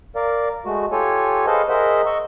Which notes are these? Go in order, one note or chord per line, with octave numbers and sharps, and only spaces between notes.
A#4 D5 F5
G#3 A3 F#4
F4 G4 A4 C#5 G#5
G#4 A4 B4 C5 D#5 F5
G#4 A#4 C5 D#5 E5 F#5
D#5 C#6 E6